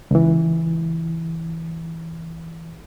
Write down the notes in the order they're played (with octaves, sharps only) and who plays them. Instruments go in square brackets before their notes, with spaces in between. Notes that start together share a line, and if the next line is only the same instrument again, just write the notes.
[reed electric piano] C#2 E3